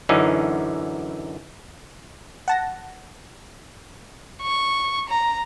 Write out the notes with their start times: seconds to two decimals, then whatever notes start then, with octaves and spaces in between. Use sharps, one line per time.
0.09 F#2 D3 E3 C#4 D#4
2.48 F#5 A5 A#6
4.43 C#6
5.09 A#5